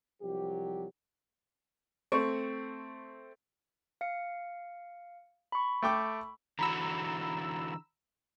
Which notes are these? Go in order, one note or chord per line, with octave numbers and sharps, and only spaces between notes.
C2 F3 F#3 G4
A3 C4 C#6
F5 C#7
B5 C#6
A3 G5 D6
D3 E3 F#4 A#5 B5 E6